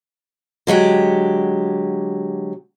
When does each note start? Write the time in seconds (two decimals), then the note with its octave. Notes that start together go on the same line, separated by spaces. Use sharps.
0.67 D3 F#3 G#3 G4